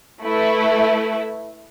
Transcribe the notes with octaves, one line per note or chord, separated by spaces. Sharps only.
A3 E4 B4 E5